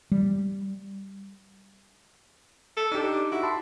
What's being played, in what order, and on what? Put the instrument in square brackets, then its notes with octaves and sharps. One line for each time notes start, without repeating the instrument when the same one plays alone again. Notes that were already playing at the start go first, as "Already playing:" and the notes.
[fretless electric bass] G3
[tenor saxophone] A4
[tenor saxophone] D4 [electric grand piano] D#4 G4
[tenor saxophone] E4 [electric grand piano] F#4
[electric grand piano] A5 B5 C6